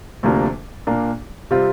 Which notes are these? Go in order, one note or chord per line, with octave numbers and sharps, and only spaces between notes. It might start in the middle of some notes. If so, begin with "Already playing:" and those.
D2 C3 F3 A#3 D4
A#2 A#3 D4
C3 G3 C4 F4